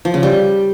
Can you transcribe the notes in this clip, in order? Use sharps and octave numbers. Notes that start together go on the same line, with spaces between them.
F3
C#3
G3